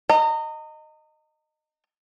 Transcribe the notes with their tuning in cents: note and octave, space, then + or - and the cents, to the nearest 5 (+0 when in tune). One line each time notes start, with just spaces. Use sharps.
D#5 -10 A#5 -35